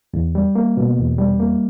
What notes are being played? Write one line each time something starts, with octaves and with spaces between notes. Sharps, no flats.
E2
G3
A#3
B2
E2
G3
A#3